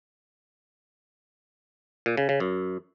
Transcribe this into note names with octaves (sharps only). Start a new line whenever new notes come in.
A#2
C#3
C#3
F#2